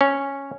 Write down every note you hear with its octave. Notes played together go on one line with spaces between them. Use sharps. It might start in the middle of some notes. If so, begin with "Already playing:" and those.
C#4